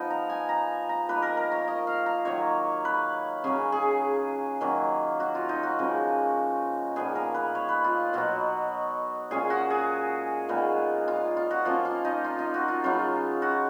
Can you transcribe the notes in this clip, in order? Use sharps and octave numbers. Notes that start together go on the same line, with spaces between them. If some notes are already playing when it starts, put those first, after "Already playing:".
Already playing: F3 B3 D#4
A#5
G#5
A#5
A#5
F3 A#3 D#4 B4
A#4
A#4
C#5
D#5
F5
A#5
D#3 F#3 A#3 D#4 C#5
B4
C#3 F#3 C#4 G#4
G#4
D#3 F#3 A#3
F#4
F4
D#4
F#4
C#3 F3 G#3
A#2 F3 B3 D#4 G#4
A#4
B4
C#5
B4
F4
B2 F#3 B3 F#4
A#2 G#3 C#4 G#4
F#4
G#4
A#2 G#3 B3 D#4
F4
F4
F#4
F3 A#3 C#4 F4
F4
D#4
F4
D#4
F#4
F4
C#3 F#3 B3 D#4 F4
F#4